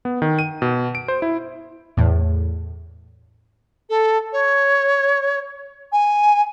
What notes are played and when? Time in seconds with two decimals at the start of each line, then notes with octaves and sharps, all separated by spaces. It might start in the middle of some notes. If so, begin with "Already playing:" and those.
0.05 B3
0.22 D#3
0.39 D#7
0.62 B2
0.95 D7
1.08 C5
1.22 E4
1.97 E2 A2
3.90 A4
4.33 C#5
5.92 G#5